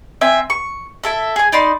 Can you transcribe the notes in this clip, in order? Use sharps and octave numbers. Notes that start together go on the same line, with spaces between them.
C4 E5 G#5
C#6
E4 A4 E5
G#4 G#5
D#4 D5 B5 C6